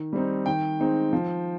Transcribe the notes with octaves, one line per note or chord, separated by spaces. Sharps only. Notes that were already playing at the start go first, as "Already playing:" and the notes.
Already playing: D#3
G3 C4 D#4
D#3 G5
G#3 C4 D#4
F3